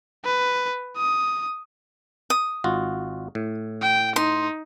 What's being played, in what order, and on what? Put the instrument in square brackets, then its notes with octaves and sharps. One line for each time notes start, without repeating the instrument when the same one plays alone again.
[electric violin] B4
D#6
[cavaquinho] D#6
[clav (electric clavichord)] G#1 F4 F#4
A2
[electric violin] G5
[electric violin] D#4 [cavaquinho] C6